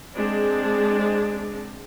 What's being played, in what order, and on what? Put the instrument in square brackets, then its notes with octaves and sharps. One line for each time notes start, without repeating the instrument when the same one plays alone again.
[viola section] G#3 C4 D4